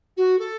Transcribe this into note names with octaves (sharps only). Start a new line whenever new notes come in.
F#4
A4